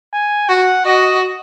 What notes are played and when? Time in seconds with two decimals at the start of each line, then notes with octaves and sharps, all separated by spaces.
0.13 G#5
0.49 F#4 F#5
0.85 F#4 D#5